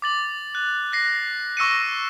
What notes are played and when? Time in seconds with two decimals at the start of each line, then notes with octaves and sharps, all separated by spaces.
0.02 D6 A6 F#7
0.55 F#6
0.93 F#6 A#6 C7
1.57 C#6 E6 A#6 C#7 D#7